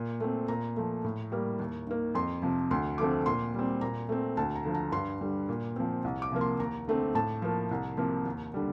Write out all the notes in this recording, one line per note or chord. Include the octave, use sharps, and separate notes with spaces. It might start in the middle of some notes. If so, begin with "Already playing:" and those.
Already playing: A#2
A3 C4
A#2 A#5
F3 A3
A2
G3 A#3
D#2
D#3 A#3
F2 C6
C3 F3
D2 C6
D3 F3 A3 C4 D6
A#2 C6
G3 C4
A#2 A#5
A3 C4
D2 A5
A#5
D3 F3
A#5
G2 C6
D3 G3
A#2
F3 C4
C2
D6
C3 F3 A#3
C6
D#2 A#5
D3 A3 C4
A2 A5
F3 A#3
C2
C3 F3 A#3
D#2
D3 G3